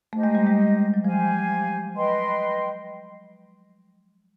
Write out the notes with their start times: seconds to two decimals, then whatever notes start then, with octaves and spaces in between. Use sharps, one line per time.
0.13 A3 D#4 G4 C5 D#5
0.24 G#3
0.35 G3
0.46 G#3
0.94 F#3
1.04 F3 G4 C5 F5 G#5
1.96 B4 D#5 G5 C6